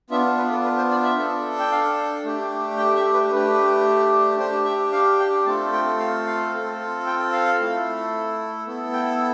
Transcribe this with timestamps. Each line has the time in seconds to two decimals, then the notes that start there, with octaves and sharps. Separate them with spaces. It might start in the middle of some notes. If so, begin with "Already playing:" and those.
0.10 B3 D4 F4 E5
0.38 B4
0.51 A4
0.64 B4
0.77 C5
0.91 D5
1.04 E5
1.18 D4 A4
1.59 G5
1.72 F5
2.24 A3 D4 G4
2.78 G5
2.96 E5
3.14 B4
3.32 A3 D4 G4 B4
4.39 D4 G4 C5
4.65 E5
4.93 F5
5.20 G5
5.45 A3 C4 F4 A4 A5
5.73 G5
5.99 F5
6.27 F5
6.53 C4 F4 A4
7.06 G5
7.33 F5
7.60 A3 E4 A4
8.67 B3 E4 A4
8.93 G5